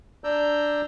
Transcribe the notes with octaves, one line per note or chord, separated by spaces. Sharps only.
D4 D5 A#5 E6 G6